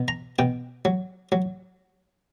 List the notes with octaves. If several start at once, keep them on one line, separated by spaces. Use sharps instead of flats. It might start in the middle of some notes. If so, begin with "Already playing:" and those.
Already playing: B2
A#5
B2 G5
F#3
F#3